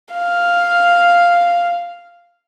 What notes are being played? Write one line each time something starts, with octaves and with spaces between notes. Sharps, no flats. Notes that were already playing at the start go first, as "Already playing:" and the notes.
F5